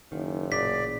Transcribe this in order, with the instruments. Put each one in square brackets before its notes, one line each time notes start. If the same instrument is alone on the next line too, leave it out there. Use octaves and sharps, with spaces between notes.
[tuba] F#1 [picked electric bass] D#3
[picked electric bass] A1 A#2 C#3 [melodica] D5 [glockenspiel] B6